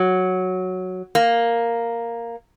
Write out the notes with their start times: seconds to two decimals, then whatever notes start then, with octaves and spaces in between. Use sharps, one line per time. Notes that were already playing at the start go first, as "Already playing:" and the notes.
Already playing: F#3
1.15 A#3